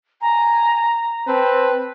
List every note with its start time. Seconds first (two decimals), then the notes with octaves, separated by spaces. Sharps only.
0.21 G#5 A#5
1.28 C4 B4 A5